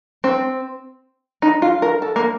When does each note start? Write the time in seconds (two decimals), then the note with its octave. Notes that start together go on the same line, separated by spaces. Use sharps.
0.24 C4
1.42 D#4
1.62 F4
1.82 A#4
2.02 A4
2.16 A#3